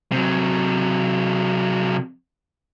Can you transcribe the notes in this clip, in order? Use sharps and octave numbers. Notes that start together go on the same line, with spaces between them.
C3 F#3